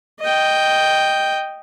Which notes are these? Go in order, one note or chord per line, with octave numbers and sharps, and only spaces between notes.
D#5 G5